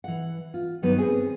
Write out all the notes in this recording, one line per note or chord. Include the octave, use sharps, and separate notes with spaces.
E3 F#5
F4
G2 D#3 F#3 B3 B4
C4 G#4